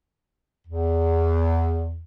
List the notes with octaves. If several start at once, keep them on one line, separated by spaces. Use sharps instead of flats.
E2